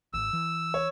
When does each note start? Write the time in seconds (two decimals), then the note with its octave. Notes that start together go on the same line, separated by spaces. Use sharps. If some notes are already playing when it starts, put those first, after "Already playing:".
0.14 G#1 E6
0.33 E3
0.74 C#5